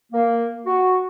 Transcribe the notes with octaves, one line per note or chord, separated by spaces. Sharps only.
A#3
F#4